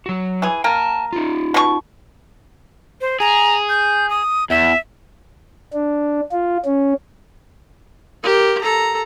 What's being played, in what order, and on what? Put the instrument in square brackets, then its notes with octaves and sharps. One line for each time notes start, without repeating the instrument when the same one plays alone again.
[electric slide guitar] F#3 F#4
[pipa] E3 G#4
[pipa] A#3 A#4 [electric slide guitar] G5 A5
[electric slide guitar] D#4 F4
[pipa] B2 D4 C#6
[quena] C5
[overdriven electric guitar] G#4 [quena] A#5
[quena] G6
D#6
[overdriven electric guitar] E2 [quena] E5
[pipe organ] D4
F4
C#4
[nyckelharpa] G4 A#4
A4 A#5